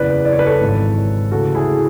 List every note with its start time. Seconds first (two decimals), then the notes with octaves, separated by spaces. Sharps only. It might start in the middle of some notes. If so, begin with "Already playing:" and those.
Already playing: F#1 E2 C#3 E3 B4 D5
0.25 D5
0.33 C#5
0.39 B4
0.46 A4 C#5
0.60 G#1 G#2 E3
1.31 D2 C#3 E3 F#4 A4
1.55 E4 G#4